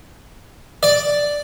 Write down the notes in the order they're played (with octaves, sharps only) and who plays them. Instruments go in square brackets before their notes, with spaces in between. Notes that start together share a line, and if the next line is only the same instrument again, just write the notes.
[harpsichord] D5